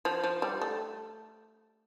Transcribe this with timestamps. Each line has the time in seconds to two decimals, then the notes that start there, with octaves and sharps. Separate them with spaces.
0.05 F3
0.24 F3
0.42 G3
0.62 A3